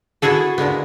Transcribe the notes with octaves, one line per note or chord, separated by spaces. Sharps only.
B3 E4 F#4 G#4 A4
A#2 D3 G#3 B3